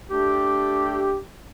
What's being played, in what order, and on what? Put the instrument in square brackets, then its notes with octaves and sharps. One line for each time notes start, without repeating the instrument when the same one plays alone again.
[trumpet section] A3 D4 G4